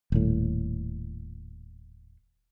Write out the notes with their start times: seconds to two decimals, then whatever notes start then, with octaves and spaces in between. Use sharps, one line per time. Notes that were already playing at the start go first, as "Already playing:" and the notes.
0.12 D#1 A2